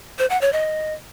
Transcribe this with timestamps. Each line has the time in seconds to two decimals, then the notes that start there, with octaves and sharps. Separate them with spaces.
0.19 C5
0.30 F#5
0.41 C#5
0.53 D#5